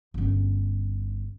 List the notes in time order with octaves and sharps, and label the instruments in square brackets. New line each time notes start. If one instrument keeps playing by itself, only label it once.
[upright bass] G1 C#4